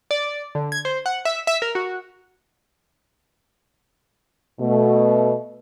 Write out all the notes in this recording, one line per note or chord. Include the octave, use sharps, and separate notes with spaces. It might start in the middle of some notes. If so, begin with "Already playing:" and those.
D5
D3
G#6
C5
F#5
E5
E5
A#4
F#4
B2 A3